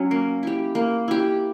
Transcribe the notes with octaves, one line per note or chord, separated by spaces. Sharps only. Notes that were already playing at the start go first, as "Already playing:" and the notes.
Already playing: F#3 C#4
A#3
E4 G4
A#3
E4 G4